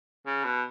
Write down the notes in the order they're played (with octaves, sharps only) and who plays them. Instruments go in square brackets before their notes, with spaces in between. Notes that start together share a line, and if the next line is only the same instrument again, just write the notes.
[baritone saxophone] C#3
B2